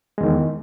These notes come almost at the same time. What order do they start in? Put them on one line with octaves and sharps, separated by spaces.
G#3 E2 D#3